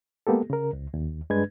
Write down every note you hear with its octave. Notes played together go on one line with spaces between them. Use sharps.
G#3 A#3 B3 G4 A4
C#3 A#4
C#2
D#2
G2 G#3 D4 B4 G#6